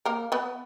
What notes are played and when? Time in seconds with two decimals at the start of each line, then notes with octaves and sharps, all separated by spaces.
0.05 A#3 A#4
0.32 B3 B4